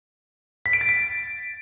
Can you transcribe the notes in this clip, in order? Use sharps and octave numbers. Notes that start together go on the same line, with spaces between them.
B6
D7
A6
D7